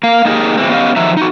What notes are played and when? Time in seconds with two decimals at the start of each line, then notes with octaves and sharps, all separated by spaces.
0.03 A#3 F5
0.25 A#3 D#4 G4 G#4 A#4
0.57 B2 E3 G#3 C4
0.69 B3 C#4 G4 D#5 F5
0.96 D#3 F3 F#3 E5 A#5
1.17 D#4 F#4